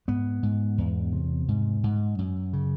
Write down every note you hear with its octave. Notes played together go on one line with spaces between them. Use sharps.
G#2 B3
G#2
E2
C3
G#2
G#2
F#2
C#3